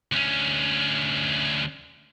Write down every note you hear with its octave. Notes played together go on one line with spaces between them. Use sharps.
D2 C#4